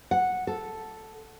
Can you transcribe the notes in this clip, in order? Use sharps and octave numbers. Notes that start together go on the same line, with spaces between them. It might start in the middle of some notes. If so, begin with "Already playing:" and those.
F#5
A4